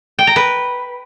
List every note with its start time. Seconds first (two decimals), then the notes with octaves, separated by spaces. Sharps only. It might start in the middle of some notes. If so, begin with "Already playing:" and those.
0.19 G5
0.27 A#5
0.36 B4